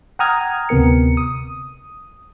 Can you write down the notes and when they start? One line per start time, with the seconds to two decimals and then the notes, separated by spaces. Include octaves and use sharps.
0.19 F#5 G5 A#5 D#6 F6 G#6
0.69 D2 C3 B3 A#4 C#7
1.17 D#6